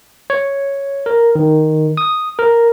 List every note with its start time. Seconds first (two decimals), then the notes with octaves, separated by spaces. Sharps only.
0.30 C#5
1.06 A#4
1.35 D#3
1.97 D#6
2.39 A#4